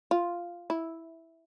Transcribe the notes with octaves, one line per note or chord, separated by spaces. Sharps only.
F4
E4